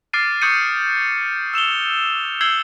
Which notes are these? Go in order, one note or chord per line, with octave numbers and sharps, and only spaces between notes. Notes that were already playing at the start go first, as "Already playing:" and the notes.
D6 F6 A6 C7 D7 D#7
C#6 D#6 G6 G#6 C#7 D#7
E6 E7 F7 G7
E6 G6 G#6 C7 F#7 G7